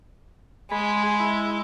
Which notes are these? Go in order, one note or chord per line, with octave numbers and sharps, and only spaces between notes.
G#3 G#4 B5
E4